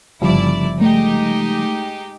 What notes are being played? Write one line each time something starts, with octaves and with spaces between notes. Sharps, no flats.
G1 C#3 F3 G3 E4 D5
G#3 A3 D#4 G4